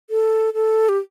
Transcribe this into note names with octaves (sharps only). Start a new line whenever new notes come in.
A4
A4
G4